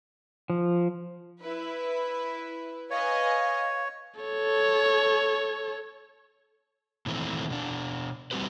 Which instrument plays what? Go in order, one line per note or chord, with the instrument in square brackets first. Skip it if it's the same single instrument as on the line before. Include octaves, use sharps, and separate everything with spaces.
[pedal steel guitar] F3
[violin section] E4 B4
[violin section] B4 D#5 G#5 [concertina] C#5 [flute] F5
[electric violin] A4 C#5
[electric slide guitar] A#2 D#3 E3 A3 C4
B2 D4
G3 C4 F#4 G4 B4